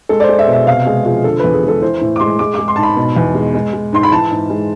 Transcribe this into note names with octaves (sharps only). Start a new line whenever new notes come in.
G#3 A4
D5
C5
G#3
E5
B2
E5
C3 F5
G#3 G#4
F3 G#4
D3 A4
E2 B4
G#4
G#3 A4
E3 C5
A2
D6
G#3 C6
G#3 D6
G#3 D6
C6
G#2 A5
B5
B2
E2
G#3
G#3
G#3
G#2 C6
B5
E3 A5
G#2
G#3